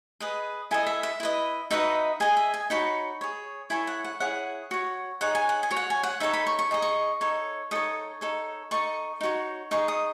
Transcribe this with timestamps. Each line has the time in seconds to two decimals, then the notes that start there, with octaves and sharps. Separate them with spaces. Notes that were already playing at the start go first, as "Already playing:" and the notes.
0.20 G#4 B4 D#5
0.71 E4 A4 D#5 G#5
0.87 E5
1.03 E5
1.20 E4 B4 D#5
1.71 D#4 F#4 B4 D#5 E5
2.20 G#4 D#5 G#5
2.37 E5
2.54 G#5
2.70 D#4 F#4 C#5 B5
3.21 G#4 C#5
3.70 E4 A4 C#5 G#5
3.87 F#5
4.04 F#5
4.20 E4 G#4 C#5 F#5
4.71 F#4 C#5
5.21 D#4 G#4 C#5 F#5
5.35 G#5
5.49 F#5
5.63 G#5
5.71 F#4 C#5
5.77 F#5
5.90 G#5
6.03 F#5
6.20 D#4 A4 C#5 E5
6.33 B5
6.47 C#6
6.59 C#6
6.71 D#4 G#4 D#5
6.82 C#6
7.21 D#4 A4 C#5
7.71 D#4 A4 C#5 D#6
8.21 D#4 A4 C#5
8.71 D#4 A4 D#5 C#6
9.21 D#4 F#4 C#5
9.71 D#4 G#4 D#5 C#6
9.88 D#6